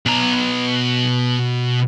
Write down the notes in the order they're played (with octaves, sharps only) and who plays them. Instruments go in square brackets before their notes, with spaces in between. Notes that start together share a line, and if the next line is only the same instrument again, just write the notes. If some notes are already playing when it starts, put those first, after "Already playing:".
[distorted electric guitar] B2 A#5